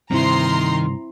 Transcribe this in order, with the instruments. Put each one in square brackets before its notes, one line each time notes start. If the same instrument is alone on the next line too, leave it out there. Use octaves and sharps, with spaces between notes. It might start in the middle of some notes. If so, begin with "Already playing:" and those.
[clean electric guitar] G2 C3 [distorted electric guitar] D#3 [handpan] C4 E4 [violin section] A#5 C6